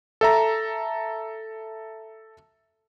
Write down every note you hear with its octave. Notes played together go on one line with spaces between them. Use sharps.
A4 E5 A#5